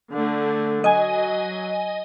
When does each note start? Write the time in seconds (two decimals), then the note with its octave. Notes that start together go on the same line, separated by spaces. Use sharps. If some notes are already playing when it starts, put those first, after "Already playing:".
0.12 D3 A3
0.84 F#3 D#5 G#5